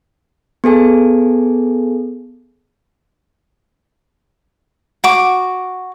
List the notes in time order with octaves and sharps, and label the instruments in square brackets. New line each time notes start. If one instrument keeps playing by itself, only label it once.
[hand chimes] B3 G#4 A4 G#5
[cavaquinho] F#4 D6